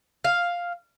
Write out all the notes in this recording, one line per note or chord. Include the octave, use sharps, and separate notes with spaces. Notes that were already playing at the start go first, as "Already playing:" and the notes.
F5